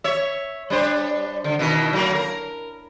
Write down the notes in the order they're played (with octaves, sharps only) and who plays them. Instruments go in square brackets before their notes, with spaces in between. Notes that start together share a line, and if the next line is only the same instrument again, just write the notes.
[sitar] C#5 E5
G3 D4 C5
D3
B2 D#3 E4
F#3 A3 A#3
A#4